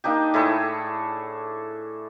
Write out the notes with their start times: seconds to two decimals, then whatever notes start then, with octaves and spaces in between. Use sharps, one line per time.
0.04 A#3 D4 D#4 G4
0.34 A2 E4 G#4 A4